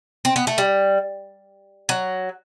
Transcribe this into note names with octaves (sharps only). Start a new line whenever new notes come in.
C4
B3
A3
G3
F#3